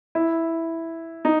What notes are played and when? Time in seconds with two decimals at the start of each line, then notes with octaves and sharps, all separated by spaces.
0.15 E4
1.25 D#4